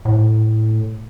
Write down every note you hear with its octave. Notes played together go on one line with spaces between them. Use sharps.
A2